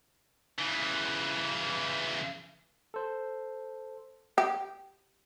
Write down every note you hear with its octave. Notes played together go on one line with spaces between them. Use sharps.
C#3 E3
A4 C5
G4